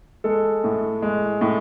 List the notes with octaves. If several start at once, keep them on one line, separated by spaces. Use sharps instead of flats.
G#3 A4
A2
G#3
A2